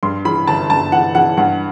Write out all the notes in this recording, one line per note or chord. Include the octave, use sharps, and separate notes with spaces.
G2 C6
E3 B5
G1 A5
G2 A5
E3 F#5
E3 F#5
G2 F#5